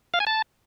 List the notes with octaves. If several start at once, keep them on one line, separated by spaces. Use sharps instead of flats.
F5
G#5
A5